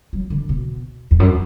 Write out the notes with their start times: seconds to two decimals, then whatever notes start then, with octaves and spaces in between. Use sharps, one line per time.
0.13 F#3
0.30 D3
0.49 B2
1.11 E2
1.20 F#2